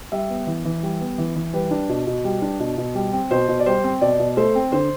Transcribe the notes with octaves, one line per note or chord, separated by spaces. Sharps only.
G3 E5
B3
E3
E3
G3
B3
E3
E3
G3 B4
D4
B2
B2
G3
D4
B2
B2
G3
C4
B2 C5
B2
D5
G3 C5
C4
B2 D5
B2
A3 C5
C4
D3 C5